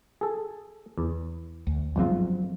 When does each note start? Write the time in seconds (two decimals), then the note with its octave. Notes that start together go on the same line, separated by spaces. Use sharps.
0.21 G#4 A4
0.98 E2
1.67 D2
1.96 G1 G#2 F3 F#3 C4 F4